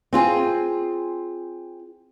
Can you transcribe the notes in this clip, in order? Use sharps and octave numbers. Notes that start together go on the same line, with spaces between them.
C4 F4 G#4